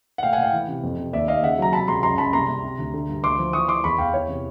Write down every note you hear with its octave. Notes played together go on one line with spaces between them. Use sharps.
F#5
A2 F5 G5
F#5 G#5
A2 F5 G5
E3
C3
F2
C3
D#2 D5 E5
D#2 D#5 F5
C#3 E5 F#5
F#3 A#5
C3 A5 B5
C#2 A#5 C6
F#2 A#5 C6
F#2 A5 B5
C2 A#5 C6
C2
C3
D2
D3
G2
D2 C6 D6
F3
E3 C#6 D#6
E3 C6 D6
E2 B5 C#6
E2 F5 G5
E3 C#5
C3